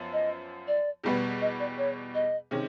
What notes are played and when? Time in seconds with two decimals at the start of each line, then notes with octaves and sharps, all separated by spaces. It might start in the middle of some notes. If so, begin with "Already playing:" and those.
Already playing: F#2 F3 B3
0.13 D#5
0.67 D5
1.04 E2 B2 G3 B3
1.41 D#5
1.59 D5
1.78 C#5
2.14 D#5
2.51 C3 D#3 G#3 C#4